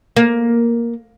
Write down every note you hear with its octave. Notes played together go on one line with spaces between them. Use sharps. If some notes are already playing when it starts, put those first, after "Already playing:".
A#3